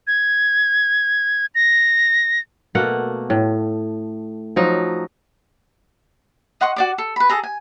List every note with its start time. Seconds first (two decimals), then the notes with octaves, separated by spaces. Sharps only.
0.07 G#6
1.55 A#6
2.75 B2 A3 A#3 F#5
3.30 A2
4.56 F3 F#3 D#4
6.61 D#5 F#5 C6 C#6
6.76 F#4 D5 D6
6.98 A4
7.16 B4 B5
7.30 G#4 A4 A#5
7.43 G#5